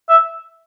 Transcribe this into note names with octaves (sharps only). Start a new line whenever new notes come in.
E5